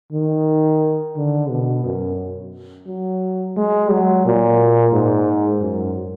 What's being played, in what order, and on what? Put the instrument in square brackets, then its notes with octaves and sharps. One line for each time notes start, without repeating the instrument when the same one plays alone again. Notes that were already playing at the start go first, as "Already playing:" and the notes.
[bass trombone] D#3
D3
B2
F#2
F#3
G#3
F#3
A#2
G#2
F#2